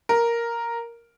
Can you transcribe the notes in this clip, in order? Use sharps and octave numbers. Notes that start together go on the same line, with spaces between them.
A#4